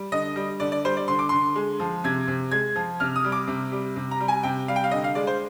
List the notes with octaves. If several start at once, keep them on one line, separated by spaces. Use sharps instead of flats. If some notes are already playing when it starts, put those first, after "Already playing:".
Already playing: G3
D3 D#5
G3
D3 D5
D5
G3 C5
D5
D3 C6
D6
D3 C6
G#3
F3
C3 G#6
C3
G#3 G#6
F3
C3 F6
D#6
G3
D6
C3
G3
C3
A#5
G3
G#5
C3 G5
G3 F5
G5
F5
D3 D#5
F5
G#3 D5
C5